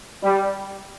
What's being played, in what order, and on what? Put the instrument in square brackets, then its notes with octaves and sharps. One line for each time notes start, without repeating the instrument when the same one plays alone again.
[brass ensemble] G3